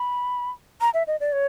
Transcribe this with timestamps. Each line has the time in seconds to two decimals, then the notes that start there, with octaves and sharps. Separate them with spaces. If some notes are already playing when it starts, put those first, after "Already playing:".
Already playing: B5
0.81 A#5
0.94 E5
1.07 D#5
1.20 D5
1.33 C#5